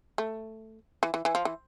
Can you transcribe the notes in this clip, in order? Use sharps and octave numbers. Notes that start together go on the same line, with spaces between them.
A3
E3
E3
E3
F3
E3